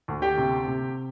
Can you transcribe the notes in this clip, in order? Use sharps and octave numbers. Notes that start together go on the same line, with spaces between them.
D2
G4 G5
C3
C3